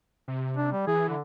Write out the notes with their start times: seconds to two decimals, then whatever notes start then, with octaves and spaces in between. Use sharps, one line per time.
0.28 C3
0.57 D4
0.72 G3
0.87 E3 G#4
1.09 D3